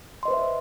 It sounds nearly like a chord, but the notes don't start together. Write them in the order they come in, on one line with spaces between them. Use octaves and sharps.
C6 D#5 B4 C5 E5